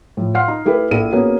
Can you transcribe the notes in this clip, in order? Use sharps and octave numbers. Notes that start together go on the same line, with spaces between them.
A2 F3
F5 F#5 C6 F6 C7
D#4
A3 E4 G4 A4 B4
A#1 E4 A4 D#7
A#3 B3 C#4 F#4 G#4